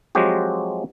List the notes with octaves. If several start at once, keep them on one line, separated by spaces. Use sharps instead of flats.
F3 F#3 G#3 C4 F#4 G4